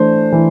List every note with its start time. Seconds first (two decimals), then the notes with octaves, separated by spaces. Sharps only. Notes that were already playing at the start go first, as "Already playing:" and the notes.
Already playing: E3 A3 D4 C5
0.32 E3